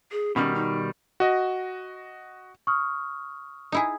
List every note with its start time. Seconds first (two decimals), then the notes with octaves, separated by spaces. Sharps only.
0.12 G#4
0.36 B2 D#3 G3 C#4
0.55 D#4
1.20 F#4 D#5
2.67 C#6 D#6 F6
3.72 D#4 E4 G#4